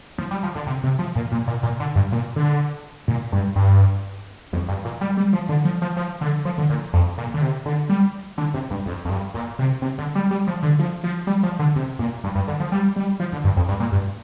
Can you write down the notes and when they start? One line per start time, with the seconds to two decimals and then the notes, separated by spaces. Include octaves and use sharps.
0.18 F3
0.31 G3
0.43 F3
0.55 D3
0.67 C3
0.83 C3
0.99 F3
1.15 A#2
1.32 A#2
1.47 A#2
1.63 A#2
1.80 D3
1.95 G2
2.12 A#2
2.36 D3
3.08 A#2
3.32 G2
3.56 G2
4.53 F2
4.68 G2
4.85 A#2
5.01 G3
5.17 G3
5.33 F3
5.49 D3
5.65 F3
5.82 F3
5.97 F3
6.21 D3
6.45 F3
6.58 D3
6.70 A#2
6.93 F2
7.18 A#2
7.34 D3
7.41 C3
7.66 D3
7.89 G3
8.38 D3
8.54 C3
8.71 G2
8.86 F2
9.05 F2
9.10 G2
9.34 A#2
9.59 C3
9.82 C3
9.98 D3
10.15 G3
10.31 G3
10.47 F3
10.62 D3
10.79 F3
11.04 F3
11.27 G3
11.43 F3
11.59 D3
11.76 C3
11.99 A#2
12.24 G2
12.35 G2
12.48 D3
12.60 F3
12.72 G3
12.96 G3
13.20 F3
13.32 D3
13.44 G2
13.56 F2
13.68 G2
13.80 A#2
13.92 G2